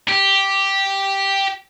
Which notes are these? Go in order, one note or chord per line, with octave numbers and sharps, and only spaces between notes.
G4